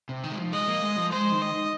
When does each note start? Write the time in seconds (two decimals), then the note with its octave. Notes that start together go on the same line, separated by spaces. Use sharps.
0.09 C3
0.24 D#3
0.32 G#3
0.38 F3
0.53 G#3 D#5
0.68 A#3
0.83 G#3
0.98 F3
1.12 G#3 C5
1.32 D#3
1.42 D#5